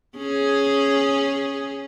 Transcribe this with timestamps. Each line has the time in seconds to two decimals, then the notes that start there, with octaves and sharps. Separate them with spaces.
0.17 C#4 G#4